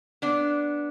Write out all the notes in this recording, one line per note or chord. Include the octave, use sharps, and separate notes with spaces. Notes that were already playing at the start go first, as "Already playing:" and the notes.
B3 D4